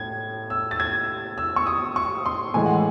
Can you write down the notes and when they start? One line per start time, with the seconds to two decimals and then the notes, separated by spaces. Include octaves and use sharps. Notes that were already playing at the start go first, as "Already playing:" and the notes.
Already playing: A2 G#6
0.50 E6
0.71 A6
0.80 G#6
1.38 E6
1.56 C#6
1.67 D#6
1.96 C#6
2.26 C6
2.54 A2 E3 G#3 G#5
2.66 F#5